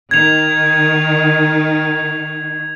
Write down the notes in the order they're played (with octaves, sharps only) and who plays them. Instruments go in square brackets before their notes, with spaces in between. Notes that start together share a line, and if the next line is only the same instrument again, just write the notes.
[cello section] D#3 [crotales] G#6 F7